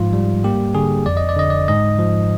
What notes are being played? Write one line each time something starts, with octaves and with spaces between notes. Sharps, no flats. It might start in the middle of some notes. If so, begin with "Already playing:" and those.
Already playing: G#2 F3 F4
G3
A#3 G4
D3 G#4
F2 D5
D#5
D5
D3 D#5
D5
G#2 D#5
F3